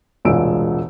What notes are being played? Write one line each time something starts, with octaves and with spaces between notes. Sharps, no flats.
E1 C2 A#2 G#3 E6 D7